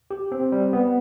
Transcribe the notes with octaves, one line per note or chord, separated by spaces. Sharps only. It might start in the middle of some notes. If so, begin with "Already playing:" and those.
G4
C4
G3
B3